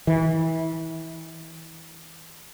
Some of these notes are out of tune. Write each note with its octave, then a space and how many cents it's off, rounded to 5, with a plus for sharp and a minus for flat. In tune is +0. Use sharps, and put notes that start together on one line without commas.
E3 -25